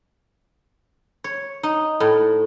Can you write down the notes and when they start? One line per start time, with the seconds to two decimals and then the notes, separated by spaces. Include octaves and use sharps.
1.24 C#5
1.63 D#4
2.00 A2